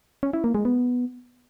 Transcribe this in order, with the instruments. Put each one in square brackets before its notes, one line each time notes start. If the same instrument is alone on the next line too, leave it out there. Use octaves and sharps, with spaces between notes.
[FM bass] C#4
E4
A#3
G#3
B3